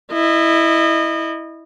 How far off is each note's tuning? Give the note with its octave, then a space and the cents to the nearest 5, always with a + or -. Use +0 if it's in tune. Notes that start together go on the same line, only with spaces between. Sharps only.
E4 -5 D#5 -25